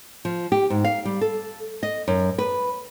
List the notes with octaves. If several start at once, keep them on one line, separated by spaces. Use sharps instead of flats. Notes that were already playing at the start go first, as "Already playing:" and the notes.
F3
G4
G#2
F5
G3
A4
D#5
F#2
B4